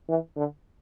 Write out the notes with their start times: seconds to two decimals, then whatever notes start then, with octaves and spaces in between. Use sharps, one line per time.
0.09 E3
0.37 D3